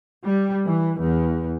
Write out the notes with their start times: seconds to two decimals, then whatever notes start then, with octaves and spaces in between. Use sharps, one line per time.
0.24 G3
0.66 E3
1.00 E2